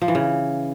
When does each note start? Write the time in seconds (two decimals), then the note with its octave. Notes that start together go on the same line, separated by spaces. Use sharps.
0.02 F3
0.08 E3
0.15 C#3